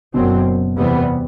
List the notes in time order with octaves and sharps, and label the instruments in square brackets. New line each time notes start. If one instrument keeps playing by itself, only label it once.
[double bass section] F#1 F#2 F#3 C4 [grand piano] B2
[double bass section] E2 C3 G3 B3